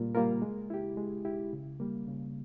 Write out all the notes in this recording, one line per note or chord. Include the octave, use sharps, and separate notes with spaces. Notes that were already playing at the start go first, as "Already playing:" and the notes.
Already playing: A#2 G3 A#3 F4 A#4
G3 A#3 F4 A#4
G#3
E4 G4
G#3
E4 G4
C#3
G3 A#3
C#3